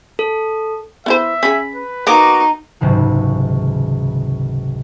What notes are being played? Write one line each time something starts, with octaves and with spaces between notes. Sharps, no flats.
A4
B3 E4 C5 E5
C#4 G#4 B5
B4
A#3 B3 D#4 F#4 A#4 A#5 D6
F#1 C#2 G#2 C3 D#3